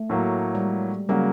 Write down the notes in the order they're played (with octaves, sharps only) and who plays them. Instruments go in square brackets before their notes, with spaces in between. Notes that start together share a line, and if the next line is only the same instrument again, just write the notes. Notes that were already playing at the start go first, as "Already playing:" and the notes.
Already playing: [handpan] A3
[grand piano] A2 F#3 A#3
[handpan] G3
G#3
[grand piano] C#3 F#3 A#3 [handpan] G3